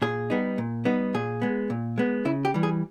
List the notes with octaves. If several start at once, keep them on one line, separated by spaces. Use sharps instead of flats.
A#2 G#4
G3 B3 D#4
A#2
G3 B3 D#4
A#2 G#4
G#3 B3
A#2
G#3 B3
C#3 E4
G4
E3 G3
G#4